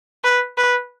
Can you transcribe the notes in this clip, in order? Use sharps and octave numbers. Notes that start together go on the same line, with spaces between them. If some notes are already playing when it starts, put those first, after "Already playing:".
B4
B4